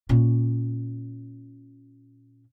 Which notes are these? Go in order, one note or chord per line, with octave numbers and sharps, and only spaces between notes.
A#2 C#4